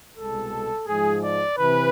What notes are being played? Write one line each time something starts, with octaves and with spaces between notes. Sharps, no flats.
C2 B2 G#3 A4
G#2 F3 G#3 G#4
D5
C3 E3 B4